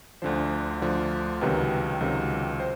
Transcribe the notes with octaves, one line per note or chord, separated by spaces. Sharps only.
D2 D3 F3 C5
D2 D3 F3
C#2 C3 D#3 F#3 B4
C#2 C3 D#3 F#3
C5